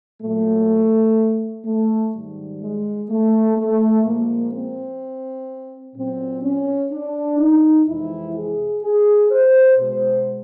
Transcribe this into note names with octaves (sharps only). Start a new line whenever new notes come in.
A#2 F#3 A3
A3
G#2 D#3 G3
G#3
A3
A3
A#2 F3 G#3 A#3
C4
A#2 F#3 C4
C#4
D4
D#4
F2 C3 E3 G#3 E4
G#4
G#4
C5
B2 G#3 C5